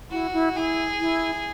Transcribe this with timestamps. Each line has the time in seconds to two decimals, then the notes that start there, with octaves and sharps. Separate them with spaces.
0.11 E4 F#4
0.33 E4
0.56 E4 G#4
1.00 E4